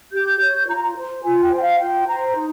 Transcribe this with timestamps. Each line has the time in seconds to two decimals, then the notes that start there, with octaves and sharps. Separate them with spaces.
0.12 G4 G6
0.40 C#5
0.67 F4 A#5
0.95 C5
1.23 F4 G#5
1.42 G5
1.51 C5
1.56 G5
1.60 F5
1.79 F4 G5
2.06 C5 A#5
2.34 D#4